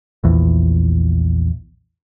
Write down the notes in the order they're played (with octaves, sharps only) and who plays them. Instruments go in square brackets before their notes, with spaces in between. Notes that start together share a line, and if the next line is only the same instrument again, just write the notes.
[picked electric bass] A#1 E2